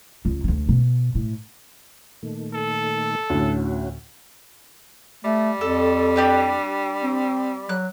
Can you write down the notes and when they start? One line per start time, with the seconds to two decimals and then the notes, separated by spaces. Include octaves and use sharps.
0.25 C#2
0.44 D2 D3
0.69 B2
1.15 A2
2.23 A#2 D#3 A3
2.54 A4
3.30 D2 A2 C#4 F#4
5.25 G3 A3
5.61 F2 A4
6.16 D4 G4 B4
7.03 C4
7.69 F#3 F#6